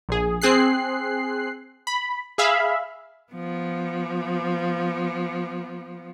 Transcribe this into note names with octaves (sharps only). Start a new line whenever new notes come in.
A#1 G#4
C4 G#4 F#6 C7
B5
G#4 E5 F5 B5
F3 B3